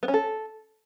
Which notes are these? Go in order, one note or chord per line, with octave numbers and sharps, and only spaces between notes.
B3
C#4
A4